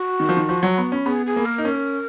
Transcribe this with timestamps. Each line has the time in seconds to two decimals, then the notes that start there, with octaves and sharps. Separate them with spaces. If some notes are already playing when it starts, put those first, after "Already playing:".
Already playing: F#4
0.20 D#3
0.29 F3
0.37 D#3
0.49 F3
0.63 F#3
0.78 B3
0.92 C#4
1.06 B3 G#4
1.26 G#4
1.36 A#3
1.45 A#4
1.58 D#4
1.65 C#4 A#4